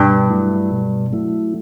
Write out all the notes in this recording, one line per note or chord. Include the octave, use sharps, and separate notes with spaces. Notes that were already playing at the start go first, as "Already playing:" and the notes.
Already playing: G2 B2
F#3 A3 E4
B2
F#3 A3 E4